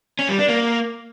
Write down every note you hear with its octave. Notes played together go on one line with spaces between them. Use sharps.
C#4
G3
D4
A#3